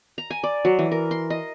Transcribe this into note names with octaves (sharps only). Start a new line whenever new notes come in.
A#5
G#5
D5
F#3
E3
A#4
C6
D#5